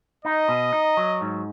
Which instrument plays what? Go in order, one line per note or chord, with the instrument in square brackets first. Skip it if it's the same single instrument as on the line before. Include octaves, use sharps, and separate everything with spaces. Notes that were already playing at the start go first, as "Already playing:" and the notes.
[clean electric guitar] D#4 [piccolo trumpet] D#5
[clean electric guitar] B2
D#4
F#3
G#2